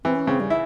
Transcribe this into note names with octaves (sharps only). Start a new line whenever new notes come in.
E3 C4
C#4
C#3 C4
G3
E4